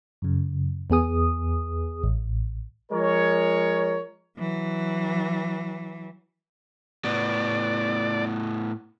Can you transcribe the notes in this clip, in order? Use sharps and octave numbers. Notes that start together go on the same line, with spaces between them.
F#2 C#3
E2 B3 G#4 D#6
A1
F3 G#3 A#4 C#5
E3 F#3
A2 B3 D5